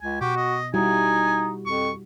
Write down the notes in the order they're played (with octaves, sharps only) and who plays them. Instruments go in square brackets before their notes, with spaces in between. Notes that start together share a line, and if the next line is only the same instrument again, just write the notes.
[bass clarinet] C#2 [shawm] G#5
[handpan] B2 [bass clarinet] F#4 [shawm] G4
[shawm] D#5
[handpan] G3 E4 F#4 [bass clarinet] D#4 [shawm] G#5
[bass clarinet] F2 [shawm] C#6